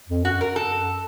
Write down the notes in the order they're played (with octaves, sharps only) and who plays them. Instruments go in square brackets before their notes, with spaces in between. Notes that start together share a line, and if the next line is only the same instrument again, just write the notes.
[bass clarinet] F2
[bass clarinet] F#2 [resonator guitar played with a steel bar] F#4
[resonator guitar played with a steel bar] A#4
A4